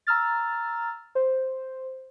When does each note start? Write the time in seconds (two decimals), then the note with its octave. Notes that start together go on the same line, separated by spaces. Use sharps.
0.07 A#5 E6 F6 A6
1.15 C5